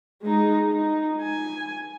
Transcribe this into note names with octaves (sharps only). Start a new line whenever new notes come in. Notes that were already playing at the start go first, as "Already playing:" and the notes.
G#3 D#4
D#4
G#5